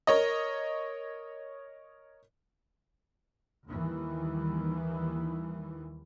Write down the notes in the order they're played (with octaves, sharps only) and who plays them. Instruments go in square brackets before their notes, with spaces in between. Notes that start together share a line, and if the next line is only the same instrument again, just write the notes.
[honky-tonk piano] A#4 C#5 D#5
[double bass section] D#2 D#3 E3 G3